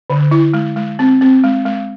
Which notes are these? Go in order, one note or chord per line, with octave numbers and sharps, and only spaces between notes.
D3
E4
G#3
G#3
C4
C4
G#3
G#3